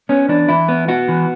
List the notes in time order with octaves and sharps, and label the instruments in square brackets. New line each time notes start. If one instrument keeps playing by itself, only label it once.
[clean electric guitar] B3 C#4
E3 D4
E3 E4
B3
B3 F#4
E3